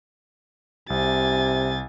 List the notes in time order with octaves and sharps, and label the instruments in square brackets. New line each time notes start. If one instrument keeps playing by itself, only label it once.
[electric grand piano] C2 [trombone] C3 [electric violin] G#5 A6